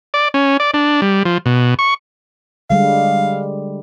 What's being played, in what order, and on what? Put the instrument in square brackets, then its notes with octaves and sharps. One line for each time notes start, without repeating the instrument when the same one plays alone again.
[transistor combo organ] D5
C#4
D5
D4
G3
F3
B2
C#6
[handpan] D3 G3 G#3 [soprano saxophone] F5